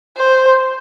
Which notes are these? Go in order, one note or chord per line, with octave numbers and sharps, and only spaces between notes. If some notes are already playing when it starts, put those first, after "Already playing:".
C5